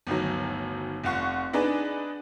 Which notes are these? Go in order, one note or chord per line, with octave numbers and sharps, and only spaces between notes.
G1 D2 D#3 F#3
F1 F4 F#5 C#6
B3 D4 D#4 G#4 B4